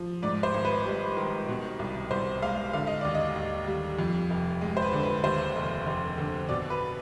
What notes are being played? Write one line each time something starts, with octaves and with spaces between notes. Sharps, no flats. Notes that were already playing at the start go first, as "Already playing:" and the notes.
Already playing: F3
G#2 D5
C5
G#1
B4
G3
D#3
B2
C2
C2 C5
G#3 F5
D3 F5
D#5
D#2 D5
D#5
D#2
G3
F2
F1
G#3
C5
B4
D3
B4
D#2 C5
F1
F1
D3
B2 D5
B4